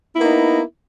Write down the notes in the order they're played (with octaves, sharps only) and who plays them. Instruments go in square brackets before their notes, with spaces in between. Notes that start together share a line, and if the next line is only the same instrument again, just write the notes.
[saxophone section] E4
B3
A#3
D#4